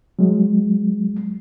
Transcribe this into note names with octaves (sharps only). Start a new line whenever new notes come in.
F#3 G#3